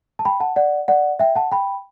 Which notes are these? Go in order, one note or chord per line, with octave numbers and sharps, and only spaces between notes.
A5
G5 B5
F#5 A5
D5 F#5
D5 F#5
E5 G5
F#5 A5
G5 B5